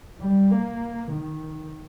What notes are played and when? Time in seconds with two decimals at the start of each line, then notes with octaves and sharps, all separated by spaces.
0.20 G3
0.51 A#3
1.12 D#3